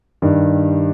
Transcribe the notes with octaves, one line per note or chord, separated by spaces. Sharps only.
G2 D#3 G3